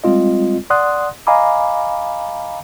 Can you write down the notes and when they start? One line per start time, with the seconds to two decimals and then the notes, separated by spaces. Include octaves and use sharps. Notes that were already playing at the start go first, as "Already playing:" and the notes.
0.04 G3 G#3 C4 F4 D#5
0.70 D5 F#5 C6 D#6 F#6
1.27 D#5 F5 G#5 A#5 B5 D6